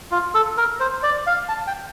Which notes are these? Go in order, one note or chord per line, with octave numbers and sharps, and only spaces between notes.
F4
A4
A#4
C5
D5
F5
A5
G5